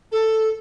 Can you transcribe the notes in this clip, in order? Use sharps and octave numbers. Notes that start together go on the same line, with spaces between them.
A4